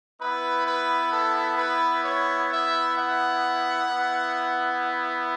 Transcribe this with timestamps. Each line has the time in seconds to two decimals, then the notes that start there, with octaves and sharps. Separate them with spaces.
0.20 B3 E4 B4
0.66 B4
1.12 A4
1.58 B4
2.04 C#5
2.50 E5
2.96 F#5
3.89 B3 E4